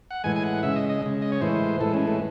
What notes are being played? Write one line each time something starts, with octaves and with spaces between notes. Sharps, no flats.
F#5
A2 E3 G#3 G#5
G#5
F#5
C#3 G#3 E5
D#5
D#5
C#3 G#3
D#5
C#5
A2 E3 G#3 C5
A2 E3 G#3 A4
C#4
A3